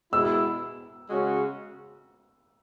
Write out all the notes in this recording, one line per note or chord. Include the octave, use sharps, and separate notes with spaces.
B2 G#3 E4 E6
C#3 G#3 C#4 F#4